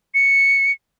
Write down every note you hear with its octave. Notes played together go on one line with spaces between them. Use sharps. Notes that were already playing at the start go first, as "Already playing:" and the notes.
C#7